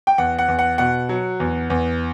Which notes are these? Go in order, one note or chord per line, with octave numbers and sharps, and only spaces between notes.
G5
E2 F#5
F#5
E2
F#5
B2 F#5
F#3
E2
E2